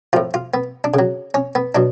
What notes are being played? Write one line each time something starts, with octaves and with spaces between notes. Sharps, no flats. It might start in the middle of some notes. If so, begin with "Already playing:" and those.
A2 F3 F4
F4
B3
D4
C#3 F#3
C#4
B3
B2 F#3 D4